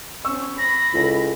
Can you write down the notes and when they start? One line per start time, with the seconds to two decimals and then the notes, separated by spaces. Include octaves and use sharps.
0.25 C4 C#4 C#6 E6
0.58 B5 A#6
0.94 C#2 E4 A4